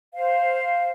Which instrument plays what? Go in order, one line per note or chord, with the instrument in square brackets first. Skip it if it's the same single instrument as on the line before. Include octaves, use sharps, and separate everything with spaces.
[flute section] C5 F5